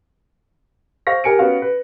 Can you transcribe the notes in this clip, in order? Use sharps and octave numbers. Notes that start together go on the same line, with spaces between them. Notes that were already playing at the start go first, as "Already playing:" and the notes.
C5 F5 C#6 A#6
G4 A#4 G#5 C#7 D7
B3 C#4 F#4 F5 F#5
B4